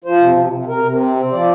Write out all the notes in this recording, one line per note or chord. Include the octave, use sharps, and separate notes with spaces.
F3 C5
C3
C3
C3
C3 A#4
C3
C4
C4
F3 D5